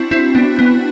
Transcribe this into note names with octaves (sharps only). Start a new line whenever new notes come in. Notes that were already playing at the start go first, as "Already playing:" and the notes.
Already playing: C4 D4 E4 F#4
C4 E4
B3 D4
B3